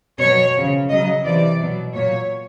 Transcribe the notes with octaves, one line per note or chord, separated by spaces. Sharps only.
B2 F#3 C#5
C#3 F3
C#3 F#3 D#5
C3 E3 D5
B2 F#3
A#2 F#3 C#5